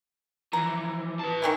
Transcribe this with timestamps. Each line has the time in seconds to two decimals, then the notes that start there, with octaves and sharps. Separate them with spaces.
0.53 E3 F3 A#5
1.19 B4 A5
1.42 D#3 E3 E4